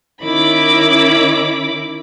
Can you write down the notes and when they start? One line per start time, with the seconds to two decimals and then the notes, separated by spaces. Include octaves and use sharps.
0.23 D#3 C#4 E4 B5 D6